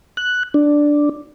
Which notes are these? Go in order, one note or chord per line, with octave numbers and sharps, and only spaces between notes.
F#6
D4